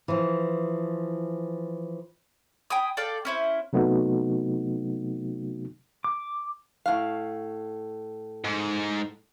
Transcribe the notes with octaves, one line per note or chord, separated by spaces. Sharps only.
E3 F3
G5 G#5 B5 D#6
A4 D5 F5 G5
C#4 E4 C5
C3 F#3 A3 B3 D#4 F#4
D6
A2 F5
G#2